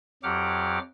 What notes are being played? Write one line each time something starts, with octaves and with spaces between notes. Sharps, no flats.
F2 F#3 G4 F#5 D6 F6